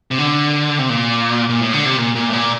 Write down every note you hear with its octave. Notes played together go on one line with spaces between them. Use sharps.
C3
D3
C3
A#2
A#2
A2
D3
C3
A#2
A#2
A2
A#2